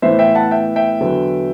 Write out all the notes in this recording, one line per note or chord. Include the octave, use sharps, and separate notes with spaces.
A2 E3 B3 C5 E5
E5 G5
F#5 A5
E5 G5
E5 G5
E2 D3 F#3 B3